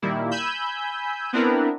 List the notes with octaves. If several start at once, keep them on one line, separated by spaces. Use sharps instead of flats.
A#2 D#3 G3 A#3 E4
G#5 B5 E6 G6
B3 C4 D4 E4 A#4 B4